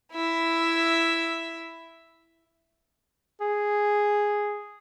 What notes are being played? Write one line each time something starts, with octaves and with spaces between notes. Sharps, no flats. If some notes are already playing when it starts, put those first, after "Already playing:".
E4 E5
G#4